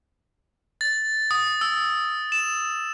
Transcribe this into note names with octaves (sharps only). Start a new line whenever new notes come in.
A6
D#6
E6
E7